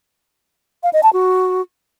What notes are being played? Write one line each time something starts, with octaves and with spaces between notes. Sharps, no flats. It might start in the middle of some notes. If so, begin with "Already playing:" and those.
F5
D#5
A5
F#4